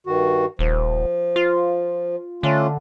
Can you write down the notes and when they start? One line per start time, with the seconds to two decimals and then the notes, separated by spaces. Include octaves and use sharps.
0.07 G2 D#3 F#4
0.59 D#1 F3
1.36 F4
2.43 D3 A3 C#4 F4